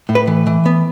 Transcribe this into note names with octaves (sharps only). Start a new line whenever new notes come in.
A2
B4
E3
E3
B3